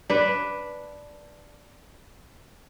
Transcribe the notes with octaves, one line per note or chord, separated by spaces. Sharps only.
D4 B4